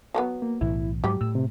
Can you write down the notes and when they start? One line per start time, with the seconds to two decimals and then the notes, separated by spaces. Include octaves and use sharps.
0.14 F#3 A3 B3
0.42 A#3
0.61 B1 A2 E3 E4
1.04 G#2 F#3 G3 G4
1.21 A2 E6
1.35 C3